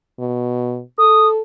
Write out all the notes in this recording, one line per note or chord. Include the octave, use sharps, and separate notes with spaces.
B2
A4 D#6